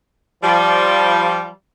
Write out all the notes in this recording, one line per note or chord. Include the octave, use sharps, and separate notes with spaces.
F3 G3